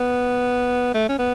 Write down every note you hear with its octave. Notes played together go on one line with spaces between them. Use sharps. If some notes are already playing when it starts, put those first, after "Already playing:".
Already playing: B3
A3
C#4
B3